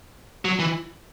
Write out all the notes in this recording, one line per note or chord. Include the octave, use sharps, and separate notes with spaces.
F#3
E3